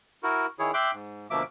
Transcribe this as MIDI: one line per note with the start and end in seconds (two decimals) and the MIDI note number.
0.23 0.46 64
0.23 0.46 66
0.23 0.46 70
0.59 0.71 51
0.59 0.71 64
0.59 0.71 68
0.59 0.71 73
0.74 0.91 76
0.74 0.91 79
0.74 0.91 84
0.74 0.91 86
0.74 0.91 90
0.93 1.27 44
1.30 1.43 38
1.30 1.43 47
1.30 1.43 53
1.30 1.43 58
1.30 1.43 76
1.30 1.43 86